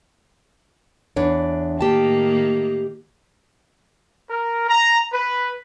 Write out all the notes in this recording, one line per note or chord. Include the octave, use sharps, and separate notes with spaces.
E2 D4 C#5
A2 D#3 A#3 G4 A5
A#4
A#5
B4